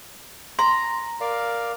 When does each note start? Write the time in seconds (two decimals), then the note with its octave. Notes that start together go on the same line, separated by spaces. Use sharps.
0.59 A#5 C6
1.21 A#4 D5 F5